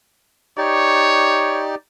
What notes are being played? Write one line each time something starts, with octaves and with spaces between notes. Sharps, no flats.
D#4 G4 C#5 D5